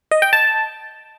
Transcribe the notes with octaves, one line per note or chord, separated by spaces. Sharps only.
D#5
G5
A5